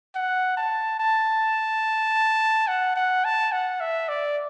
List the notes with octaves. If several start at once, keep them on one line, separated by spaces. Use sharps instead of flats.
F#5
A5
A5
F#5
F#5
A5
F#5
E5
D5